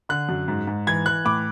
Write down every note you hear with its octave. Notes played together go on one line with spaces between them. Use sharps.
D3 F#6
F#2
G#2
G#2
E3 G#6
E3 F#6
A2 D6